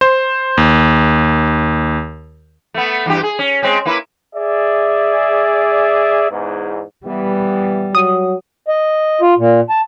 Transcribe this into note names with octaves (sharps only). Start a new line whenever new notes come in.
C5
D#2
A3 B3
E2 G2 G4
G#4
C#4
G#3 C4 C#4
A#3 E4 B4
G#4 D5 E5
E2 G#2
E3 G3 B3
F#3 D#6
D#5
F4
A#2
A5